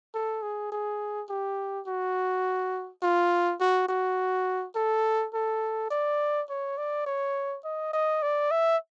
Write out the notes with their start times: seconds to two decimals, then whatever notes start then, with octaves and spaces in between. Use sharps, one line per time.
0.14 A4
0.42 G#4
0.72 G#4
1.29 G4
1.87 F#4
3.02 F4
3.60 F#4
3.89 F#4
4.75 A4
5.34 A4
5.90 D5
6.49 C#5
6.78 D5
7.06 C#5
7.64 D#5
7.93 D#5
8.22 D5
8.51 E5